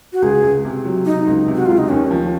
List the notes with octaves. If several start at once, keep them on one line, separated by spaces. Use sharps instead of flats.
F#4
C#2 G#4
C#2
C3
F#3
C3 D#4
C#2
C3
F#4
C#2 F4
D#4
D#2 C#4
F3